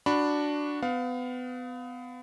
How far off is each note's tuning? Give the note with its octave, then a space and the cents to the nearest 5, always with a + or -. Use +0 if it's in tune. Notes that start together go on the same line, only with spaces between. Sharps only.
D4 +0 F#4 +0 B5 +0
B3 +30 F5 +25